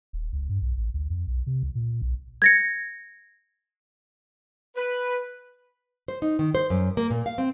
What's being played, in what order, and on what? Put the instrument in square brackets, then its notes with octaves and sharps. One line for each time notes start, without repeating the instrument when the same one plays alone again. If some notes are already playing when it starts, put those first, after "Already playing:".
[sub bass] D#1
C#2
G2
B1
A1
D2
F2
B1
C3
C#2
A#2
B1
[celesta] G#6 A#6 C#7
[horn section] B4
[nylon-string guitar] C5
D#4
D#3
C5
F#2
A#3
A#2
F5
C4